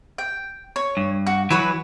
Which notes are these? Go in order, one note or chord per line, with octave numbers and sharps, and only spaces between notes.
G5
C#5
G2
F#4
E3 F#3 F#4 B4 C#5